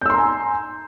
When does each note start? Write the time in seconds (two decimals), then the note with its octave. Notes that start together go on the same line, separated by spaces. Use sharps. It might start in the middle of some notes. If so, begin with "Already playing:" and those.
0.01 G6
0.06 E6
0.10 C6
0.14 A#5
0.18 G#5